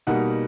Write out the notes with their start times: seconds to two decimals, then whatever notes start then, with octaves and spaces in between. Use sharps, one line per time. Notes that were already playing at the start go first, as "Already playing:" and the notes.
0.07 B2 G3 A#3 D#4 F#5